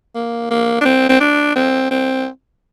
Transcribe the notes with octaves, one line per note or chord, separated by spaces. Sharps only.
A#3
A#3
D4
C4
C4
D4
C4
C4